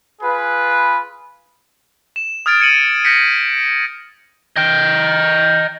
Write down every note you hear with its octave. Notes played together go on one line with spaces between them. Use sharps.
F4 G#4 B4
E7
D#6 F6 G#6 A6 D7
G#6 C#7 D#7 F#7
G6 A#6 B6 C#7
D#5 G5